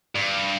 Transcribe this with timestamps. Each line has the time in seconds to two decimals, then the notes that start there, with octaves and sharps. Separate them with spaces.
0.16 G2